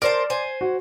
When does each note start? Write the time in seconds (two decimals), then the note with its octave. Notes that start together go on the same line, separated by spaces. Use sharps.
0.02 A#4 C5 D5 A5
0.30 C5 G#5
0.61 F#4